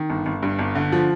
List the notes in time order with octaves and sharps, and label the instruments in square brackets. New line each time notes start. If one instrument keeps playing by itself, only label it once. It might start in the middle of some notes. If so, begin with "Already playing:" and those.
Already playing: [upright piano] D#3
G1
G1
G2
G1
D3
F3